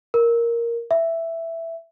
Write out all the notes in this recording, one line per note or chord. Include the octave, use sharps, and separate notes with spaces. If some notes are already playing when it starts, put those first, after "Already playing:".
A#4
E5